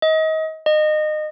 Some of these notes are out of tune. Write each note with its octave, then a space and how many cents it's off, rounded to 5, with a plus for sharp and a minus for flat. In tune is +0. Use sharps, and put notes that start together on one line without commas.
D#5 +30
D#5 -25